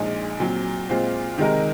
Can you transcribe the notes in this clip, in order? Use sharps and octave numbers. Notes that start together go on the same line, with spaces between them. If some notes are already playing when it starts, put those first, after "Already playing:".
Already playing: A#1 A#2 G#3 D#4 G#4
A#2 F#3 C4
A#2 G#3 C4 F4 C5
C3 D#3 G#3 D#4 A#4